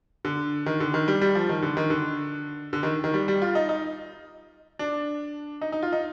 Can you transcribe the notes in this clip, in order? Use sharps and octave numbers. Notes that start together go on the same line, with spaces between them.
D3
D#3
D3
D#3
G3
G3
F3
D#3
D3
D#3
D3
D3
D#3
D#3
G3
G3
F4
D#4
D#4
D4
D#4
D#4
F4
D#4